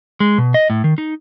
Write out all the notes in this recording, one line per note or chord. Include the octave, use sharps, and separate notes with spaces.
G#3
B2
D#5
A2
D#3
D#4